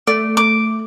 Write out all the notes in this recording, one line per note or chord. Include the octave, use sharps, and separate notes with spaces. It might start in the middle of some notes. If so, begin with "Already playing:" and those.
A3 D5
D6